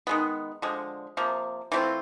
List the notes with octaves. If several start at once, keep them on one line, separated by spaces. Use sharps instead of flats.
D#3 G#3 B3
D3 F3 G#3
C3 F3 A#3
E3 A3 C4 F4